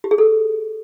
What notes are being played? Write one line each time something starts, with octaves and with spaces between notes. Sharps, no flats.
G4
G#4
A4